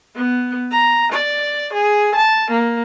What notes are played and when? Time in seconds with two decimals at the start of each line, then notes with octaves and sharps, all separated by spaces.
0.16 B3
0.71 A#5
1.12 D5
1.73 G#4
2.15 A5
2.51 A#3